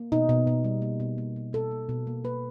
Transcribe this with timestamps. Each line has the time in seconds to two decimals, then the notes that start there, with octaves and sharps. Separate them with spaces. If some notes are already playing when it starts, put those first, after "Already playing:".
Already playing: A#3
0.12 B2 D#4
0.29 B2
0.47 B2
0.64 G3
0.82 A#3
1.00 B2
1.18 A#3
1.36 B2
1.53 B2 A4
1.71 A#3
1.89 B2
2.07 A#3
2.24 A#3 B4